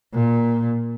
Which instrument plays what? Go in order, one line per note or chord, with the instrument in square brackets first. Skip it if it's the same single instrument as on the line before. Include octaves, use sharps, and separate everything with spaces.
[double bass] A#2